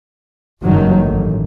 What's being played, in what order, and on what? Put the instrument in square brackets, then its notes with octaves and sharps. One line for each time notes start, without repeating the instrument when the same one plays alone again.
[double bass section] F#1 G2 D#3 F#3
A1